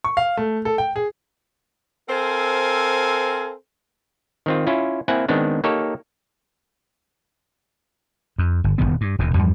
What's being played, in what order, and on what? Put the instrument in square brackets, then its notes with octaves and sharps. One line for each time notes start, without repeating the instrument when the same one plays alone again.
[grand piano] C#6
F5
A3
A4
G5
G#4
[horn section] C4 A4 A#4 C5 F5 G#5
[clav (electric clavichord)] D#3 C4 F4
C#4 E4 F4
A#3 C4 E4 F#5 G#5
D#3 G#3 B3 C4 D4
A#3 D#4 G4 A4 C#5
[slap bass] F2
G1
D#1 E2 D#3 B3
G2
E1 D#2 B2
E2 G2 F3 G3